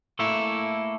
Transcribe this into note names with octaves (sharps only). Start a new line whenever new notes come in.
A3 A#3 E4 A4